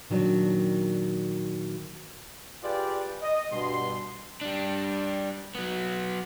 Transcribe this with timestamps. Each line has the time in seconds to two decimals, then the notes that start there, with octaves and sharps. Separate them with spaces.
0.10 A#2 D#3 F#3 D4
2.63 F4 G4 G#4 B4 D5
3.22 D#5
3.51 G2 B2 C6
4.41 G3 D4
5.55 F#3 B3